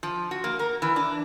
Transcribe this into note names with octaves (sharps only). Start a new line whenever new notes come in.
F3
F#4
A#3
A#4
E3
D4